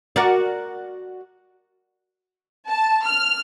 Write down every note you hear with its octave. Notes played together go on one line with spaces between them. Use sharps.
F#4 A#4 D5
A5
F6